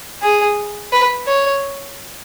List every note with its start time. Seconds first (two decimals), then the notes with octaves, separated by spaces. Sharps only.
0.22 G#4
0.92 B4
1.27 C#5